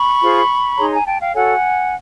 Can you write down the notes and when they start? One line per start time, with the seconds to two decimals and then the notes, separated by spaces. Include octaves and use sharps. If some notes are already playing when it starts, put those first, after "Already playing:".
Already playing: B5 C#6
0.22 F4 G#4 C5
0.77 D#4 G#4 C#5 A#5 C6
0.92 G#5 A#5
1.06 G5 A5
1.20 F5 G5
1.34 F#4 A4 C#5 F#5 G#5